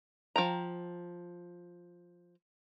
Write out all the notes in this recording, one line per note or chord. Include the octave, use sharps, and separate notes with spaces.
F3 G5 A#5